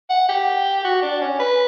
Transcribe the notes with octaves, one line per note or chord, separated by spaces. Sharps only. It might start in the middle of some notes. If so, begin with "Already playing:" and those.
F#5
G4
F#4
D4
C#4
B4